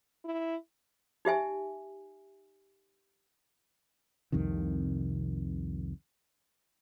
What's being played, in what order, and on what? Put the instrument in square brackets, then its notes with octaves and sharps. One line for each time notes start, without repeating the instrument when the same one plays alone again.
[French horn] E4
[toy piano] D#4 G4 E5 G#5
[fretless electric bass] C2 F2 C3 D#3